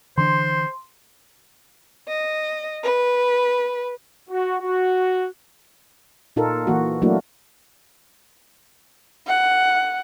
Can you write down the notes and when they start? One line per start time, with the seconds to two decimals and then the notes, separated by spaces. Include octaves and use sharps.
0.18 D3 E3 D4 C5 C6
2.08 D#5
2.83 B4
4.30 F#4
4.61 F#4
6.36 A#2 D#4 F4 A4 A#4
6.67 E3 A#3 F#4
7.02 F#3 A3 A#3 D4 E4 F#4
9.27 F#5